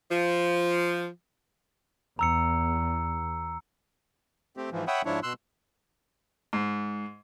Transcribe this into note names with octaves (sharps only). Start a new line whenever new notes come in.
F3
E2 A#5 E6 C#7
A3 C4 G4
G#2 E3 F3
C#5 E5 F#5 G5 B5 D#6
G#2 F3 D4 E4 C#5
B2 C6 E6 F#6
G#2